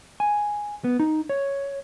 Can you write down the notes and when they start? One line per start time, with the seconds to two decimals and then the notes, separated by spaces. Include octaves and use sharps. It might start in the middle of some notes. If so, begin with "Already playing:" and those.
0.20 G#5
0.84 B3
0.99 D#4
1.29 C#5